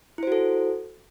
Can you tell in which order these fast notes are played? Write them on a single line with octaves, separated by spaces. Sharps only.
E4 C5 F#4 A4